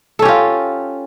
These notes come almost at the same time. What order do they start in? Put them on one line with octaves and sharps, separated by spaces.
A4 C#4 G4 F4